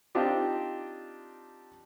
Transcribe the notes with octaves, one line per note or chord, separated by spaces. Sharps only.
C4 D4 D#4 F4 G4